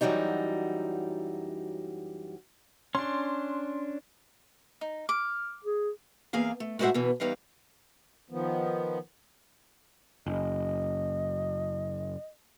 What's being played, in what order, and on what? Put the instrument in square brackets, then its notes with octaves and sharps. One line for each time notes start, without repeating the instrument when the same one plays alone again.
[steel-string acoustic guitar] F#2 E3 F#3 G3 D#4
[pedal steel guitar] C#4 D4 [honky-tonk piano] C6
[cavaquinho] D#4
[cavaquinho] D6 [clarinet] F6
[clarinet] G#4
[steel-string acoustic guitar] E2 A#3 G#4 F5
A3
A2 G#3 F#4 C5 E5 F#5
E2 B2 E3
E2 G3 D#4 B4 F5
[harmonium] D#3 F3 B3
[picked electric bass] F#1 [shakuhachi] D#5